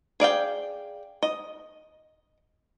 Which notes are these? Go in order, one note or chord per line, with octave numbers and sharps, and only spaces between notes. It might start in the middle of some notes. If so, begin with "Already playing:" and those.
G#4 D5 F5 G5
D#5